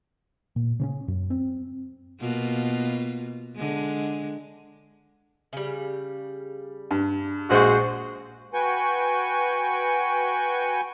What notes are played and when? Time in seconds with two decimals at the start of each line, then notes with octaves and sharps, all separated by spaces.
0.56 A#2
0.80 C#3 C4 C#4
1.08 F#2
1.30 C4
2.20 B2 A#3 F4
3.55 D3 G#3
5.53 C#3 G3
6.91 G2
7.50 A#1 G#3 F#4 C5 C#6
8.53 F#4 B4 G5 G#5 C#6